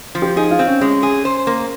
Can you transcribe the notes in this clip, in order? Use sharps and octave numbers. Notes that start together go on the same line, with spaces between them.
F3
G4
D#4 G#4
F4
C4
C#4
G#3 C#4
G#4
C5
A#3